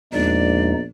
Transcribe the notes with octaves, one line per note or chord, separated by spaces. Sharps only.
A#1 E2 G#3 D#4 D5